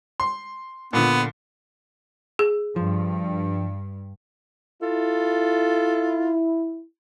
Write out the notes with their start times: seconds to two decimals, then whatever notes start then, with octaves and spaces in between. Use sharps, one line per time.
0.20 C6
0.93 A#2 D3 B3
2.39 G#4
2.76 G2 F3
4.82 E4 F4 A4